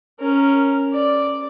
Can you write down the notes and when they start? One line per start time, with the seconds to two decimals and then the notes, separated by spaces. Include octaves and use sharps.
0.20 C#4 A#4
0.93 D5